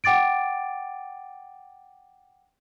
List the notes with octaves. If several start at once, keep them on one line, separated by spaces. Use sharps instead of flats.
F#5 G5 D6 A6 D7